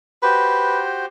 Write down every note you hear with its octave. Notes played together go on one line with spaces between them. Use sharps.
F#4 G4 B4 C5